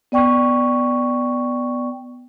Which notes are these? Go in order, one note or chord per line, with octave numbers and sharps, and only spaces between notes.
B3 D5 G5 C#6